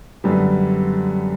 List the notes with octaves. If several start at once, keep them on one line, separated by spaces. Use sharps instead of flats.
F#2 D3 G3 B3